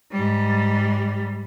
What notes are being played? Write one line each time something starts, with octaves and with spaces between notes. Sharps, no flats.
G#2 G3